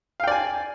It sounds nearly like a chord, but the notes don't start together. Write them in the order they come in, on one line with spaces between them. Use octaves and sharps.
F5 G5 D5 G#5